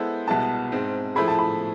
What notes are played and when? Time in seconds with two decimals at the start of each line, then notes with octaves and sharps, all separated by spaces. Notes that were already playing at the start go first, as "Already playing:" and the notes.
Already playing: G#3 B3 E4 A4 C5
0.27 C2 B2 G#3 B3 A5
0.72 G#2 G#3 C4
1.15 F3 A3 E4 G#4 B5
1.28 A5
1.39 B5